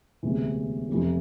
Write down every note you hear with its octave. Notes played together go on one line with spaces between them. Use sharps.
E1 D2 C3 E3
F1 F2 E3